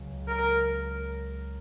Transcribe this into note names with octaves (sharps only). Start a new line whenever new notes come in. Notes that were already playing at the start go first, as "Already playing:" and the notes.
Already playing: C#2 C#3 F#3 C#4
A#4